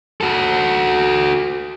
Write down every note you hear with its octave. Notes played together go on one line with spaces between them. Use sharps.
F#4 A4